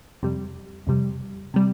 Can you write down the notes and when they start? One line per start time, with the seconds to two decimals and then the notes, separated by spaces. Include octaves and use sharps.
0.23 F2 C3 G3
0.87 F2 C3 G3
1.54 C3 G3